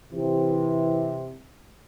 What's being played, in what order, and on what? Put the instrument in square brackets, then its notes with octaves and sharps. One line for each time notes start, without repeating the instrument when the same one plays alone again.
[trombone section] C3 [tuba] E3